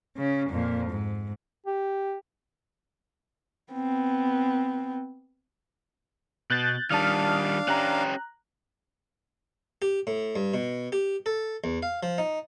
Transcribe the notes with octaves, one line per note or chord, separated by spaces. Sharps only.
C#3 C#4
F2 A#2
G#2
G4
B3 C4
B2 F#6 G6 A6
D#3 G3 D4 F5 A5 D#6 F6
C#4 G4 A#5 F#6
G4
A2
G2
B2
G4
A4
E2
F5
F3
D#4